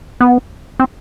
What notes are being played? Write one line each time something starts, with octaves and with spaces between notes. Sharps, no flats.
B3
C4